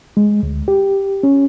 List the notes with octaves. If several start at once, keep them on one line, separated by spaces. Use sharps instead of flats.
G#3
D2
G4
C#4